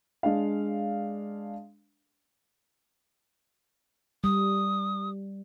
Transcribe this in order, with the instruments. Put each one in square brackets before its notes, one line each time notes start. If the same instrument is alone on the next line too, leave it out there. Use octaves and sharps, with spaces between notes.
[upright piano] G#3 D4 F5
[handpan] G3 [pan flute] D#6